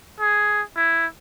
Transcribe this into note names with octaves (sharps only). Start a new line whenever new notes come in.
G#4
E4